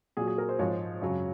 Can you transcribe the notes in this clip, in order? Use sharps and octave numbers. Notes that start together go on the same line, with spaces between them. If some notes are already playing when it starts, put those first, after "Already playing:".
A#2 F#3 G#4
G#4
A#4
C5
G#2 F3 G#3 C#5
F#2 C#3 F#3